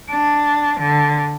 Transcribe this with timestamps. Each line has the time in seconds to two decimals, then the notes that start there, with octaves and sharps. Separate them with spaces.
0.11 D4
0.80 D3